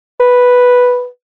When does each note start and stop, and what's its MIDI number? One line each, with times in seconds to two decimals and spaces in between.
0.20 1.07 71